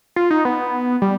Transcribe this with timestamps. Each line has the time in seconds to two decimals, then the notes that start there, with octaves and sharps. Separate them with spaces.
0.16 F4
0.31 D#4
0.45 B3
1.02 G3